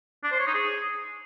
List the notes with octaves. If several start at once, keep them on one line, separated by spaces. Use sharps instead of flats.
D4
C5
C#5
D#4
G#4